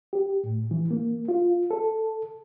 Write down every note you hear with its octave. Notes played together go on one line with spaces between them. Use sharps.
G4
A2
E3
A#3
F4
A4